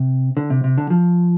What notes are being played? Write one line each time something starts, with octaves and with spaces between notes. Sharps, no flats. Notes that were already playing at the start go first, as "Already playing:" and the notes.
Already playing: C3
D3
C3
C3
D3
F3